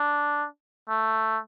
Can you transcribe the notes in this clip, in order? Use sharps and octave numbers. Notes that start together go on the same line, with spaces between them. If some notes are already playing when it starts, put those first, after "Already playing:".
Already playing: D4
A3